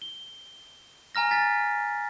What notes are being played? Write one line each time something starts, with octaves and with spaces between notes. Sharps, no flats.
G7
G#5 A#5 F6 A#6
G#5 A6 B6